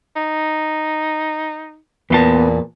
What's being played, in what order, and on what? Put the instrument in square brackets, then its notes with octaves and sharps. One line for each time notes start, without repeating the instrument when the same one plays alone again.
[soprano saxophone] D#4
[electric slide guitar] E2 F4 A5 [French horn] A#2 [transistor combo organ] B3